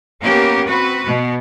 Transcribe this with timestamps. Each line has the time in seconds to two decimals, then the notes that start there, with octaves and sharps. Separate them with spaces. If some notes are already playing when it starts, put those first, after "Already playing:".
0.23 A#3 B3 C#4 G4 A#4
0.68 C4 F#4 B4
1.08 B2 B3